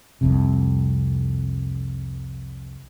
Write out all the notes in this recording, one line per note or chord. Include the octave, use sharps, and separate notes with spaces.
C2 F2 C3